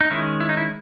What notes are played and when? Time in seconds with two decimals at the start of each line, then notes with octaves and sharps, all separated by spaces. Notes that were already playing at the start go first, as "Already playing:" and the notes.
0.01 D#4
0.10 D#3 G#3 C#4 E4
0.40 E4
0.49 D#4
0.57 E4